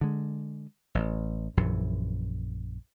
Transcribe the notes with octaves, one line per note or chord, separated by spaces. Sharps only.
D3 G#3
A1
A#1 F#2 E3